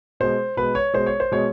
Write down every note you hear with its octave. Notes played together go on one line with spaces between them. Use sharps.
B2 G#3 C5
B2 G#3 B4
C#5
B2 G#3 C5
C#5
C5
B2 G#3 C#5